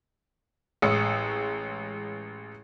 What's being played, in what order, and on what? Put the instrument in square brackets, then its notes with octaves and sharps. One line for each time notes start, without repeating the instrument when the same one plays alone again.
[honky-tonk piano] A1 G#3 C#5 D#6 E6 C#7